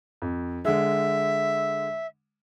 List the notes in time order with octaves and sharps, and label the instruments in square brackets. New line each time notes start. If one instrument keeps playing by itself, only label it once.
[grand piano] F2
[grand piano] D3 G#3 [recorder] E5